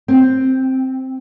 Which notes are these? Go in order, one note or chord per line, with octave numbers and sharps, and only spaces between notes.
C4